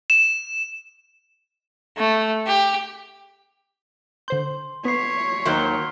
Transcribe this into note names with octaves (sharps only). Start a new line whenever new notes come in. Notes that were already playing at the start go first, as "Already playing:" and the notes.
E7
A3
G4
D3 C5 C6 G6
B3 C#5 B6 C7
D#2 D#3 F#3 C6 F6 G7